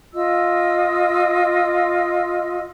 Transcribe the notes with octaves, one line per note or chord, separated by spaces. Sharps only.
F4 D#5 E6